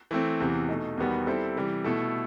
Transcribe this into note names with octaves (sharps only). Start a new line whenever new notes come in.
E3 A3 C4
E2 C3 E3
B2 A3 D#4
E2 D#3 G3 B3 F#4
G3 C4 E4 A4 C5
C3 E3 G3
B2 A3 E4 A4